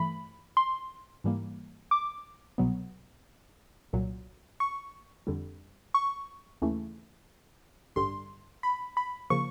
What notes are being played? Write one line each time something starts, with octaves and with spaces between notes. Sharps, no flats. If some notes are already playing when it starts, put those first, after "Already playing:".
Already playing: G2 E3 A3 B5
C6
G#2 E3 G3 A#3
D6
C2 B2 F#3 B3
C2 A#2 F#3
C#6
F2 D3 G3
C#6
D#2 C#3 E3 A3
A1 G2 D3 G3 C6
B5
B5
C#3 F3 A#3 C#6